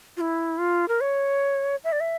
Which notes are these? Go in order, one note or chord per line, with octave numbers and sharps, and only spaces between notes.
F4
E4
F4
A#4
C#5
E5
D5
E5